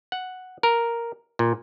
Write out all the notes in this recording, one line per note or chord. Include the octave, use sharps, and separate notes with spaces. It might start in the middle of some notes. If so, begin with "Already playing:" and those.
F#5
A#4
A#2